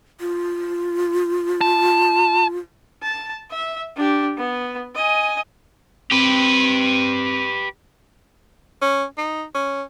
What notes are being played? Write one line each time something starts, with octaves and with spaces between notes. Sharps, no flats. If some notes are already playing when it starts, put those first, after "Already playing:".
F4
A5
A5
E5
D4 G4
B3
D#5 G#5
C4 G4 B4
C#4
D#4
C#4